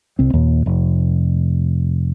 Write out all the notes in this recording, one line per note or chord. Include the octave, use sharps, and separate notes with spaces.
C2 C4
D#2 A#2
F1